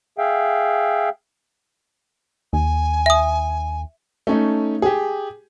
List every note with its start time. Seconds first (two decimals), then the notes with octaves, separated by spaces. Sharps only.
0.18 G#4 E5 F5 G5
2.53 D#2 G#5
3.06 E5 D#6
4.27 A3 C#4 D#4
4.82 G4 G#4